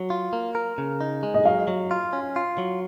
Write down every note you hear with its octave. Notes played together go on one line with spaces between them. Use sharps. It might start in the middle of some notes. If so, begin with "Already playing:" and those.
Already playing: F#3
F4
A#3
A#4
C#3
D#4
G#3
D#5
F#3 F5
F#3
F4
C#4
F4
F#3